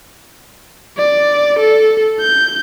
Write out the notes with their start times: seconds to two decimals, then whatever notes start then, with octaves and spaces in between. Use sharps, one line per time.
0.97 D5
1.59 A4
2.20 G6